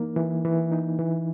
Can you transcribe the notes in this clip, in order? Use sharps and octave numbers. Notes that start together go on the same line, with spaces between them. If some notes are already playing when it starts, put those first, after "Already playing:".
Already playing: E3 A#3 D#4
E3
E3
D#4
E3